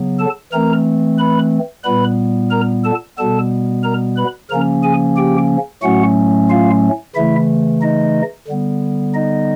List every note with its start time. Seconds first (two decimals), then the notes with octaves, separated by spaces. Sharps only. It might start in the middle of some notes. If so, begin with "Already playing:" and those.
Already playing: C#3 F#3 B3
0.19 A4 A5
0.52 E3 A3 C4 A#4 A#5
1.19 B4 B5
1.84 A#2 G3 B3 B4 B5
2.51 A#4 A#5
2.84 A4 A5
3.18 B2 G3 B3 A4 A5
3.84 A#4 A#5
4.17 B4 B5
4.50 C#3 F3 A#3 C#4 A#4 A#5
4.83 G#4 G#5
5.17 G4 G5
5.83 A2 F#3 A3 C#4 F#4 F#5
6.50 F4 F5
7.15 C#3 E3 A3 E4 E5
7.81 D#4 D#5
8.48 D3 G3 B3
9.14 D#4 D#5